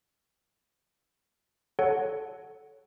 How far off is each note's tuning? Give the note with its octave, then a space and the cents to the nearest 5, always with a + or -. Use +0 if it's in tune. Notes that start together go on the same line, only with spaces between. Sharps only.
A4 -10 C#5 +0 F#5 +0